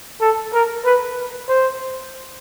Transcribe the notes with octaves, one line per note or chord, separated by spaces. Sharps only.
A4
A#4
B4
C5